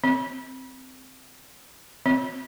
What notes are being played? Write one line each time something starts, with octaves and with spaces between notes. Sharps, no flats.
C4
C4